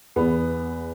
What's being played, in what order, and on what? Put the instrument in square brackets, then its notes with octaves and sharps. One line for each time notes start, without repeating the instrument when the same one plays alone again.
[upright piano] E2 B3